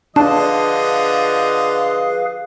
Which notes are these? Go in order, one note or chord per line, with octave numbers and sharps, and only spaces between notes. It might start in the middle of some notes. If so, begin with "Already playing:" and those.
D3 F3 D4 G#4 B4 D#5 F5 A5